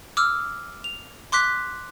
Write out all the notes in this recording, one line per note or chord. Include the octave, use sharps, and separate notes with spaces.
D6 E6 F6
F7
C6 D6 F#6 B6